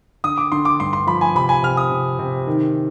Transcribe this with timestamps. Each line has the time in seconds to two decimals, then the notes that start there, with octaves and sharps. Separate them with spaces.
0.24 D3 D#6
0.37 D6
0.52 D3 C6
0.65 D6
0.80 G2 C6
0.93 C6
1.07 F3 B5
1.21 G#5
1.35 C3 B5
1.49 G#5
1.63 C3 F6
1.77 D#6
1.91 C3
2.19 C3
2.47 D#3